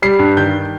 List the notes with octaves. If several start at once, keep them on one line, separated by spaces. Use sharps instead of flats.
G3 C7
G2
D#3 G6